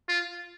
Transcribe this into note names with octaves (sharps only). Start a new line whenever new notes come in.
F4